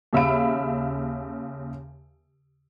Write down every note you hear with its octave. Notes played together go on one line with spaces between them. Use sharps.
D#2 C#3 E5 F5 B5 D7